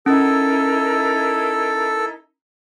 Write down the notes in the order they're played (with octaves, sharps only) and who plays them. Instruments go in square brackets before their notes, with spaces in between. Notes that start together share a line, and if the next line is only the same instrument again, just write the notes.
[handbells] C#4 [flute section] D#4 E4 A#4 [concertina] A4